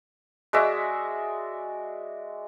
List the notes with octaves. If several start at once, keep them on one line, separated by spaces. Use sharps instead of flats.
G#3 F#4 D5 E5